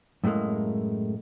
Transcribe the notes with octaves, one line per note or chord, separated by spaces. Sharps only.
F#2 A2 D#3 G#3 A#3